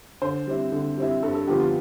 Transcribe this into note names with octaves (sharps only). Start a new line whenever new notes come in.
D3 C5
G3 C4 E4
D3
G3 C4 E4
G2 A4
A4
D3 F3 B3 F4 G4
F4